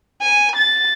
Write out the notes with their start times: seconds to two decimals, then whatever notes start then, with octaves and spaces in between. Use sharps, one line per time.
0.22 G#5
0.56 A6